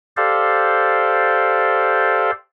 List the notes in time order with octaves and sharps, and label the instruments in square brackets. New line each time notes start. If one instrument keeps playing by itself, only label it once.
[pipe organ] G4 A4 C5 D5 F5